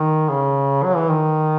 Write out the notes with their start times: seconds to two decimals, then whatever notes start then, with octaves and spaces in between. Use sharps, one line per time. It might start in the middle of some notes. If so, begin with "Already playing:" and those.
Already playing: D#3
0.30 C#3
0.84 F#3
0.96 E3
1.09 D#3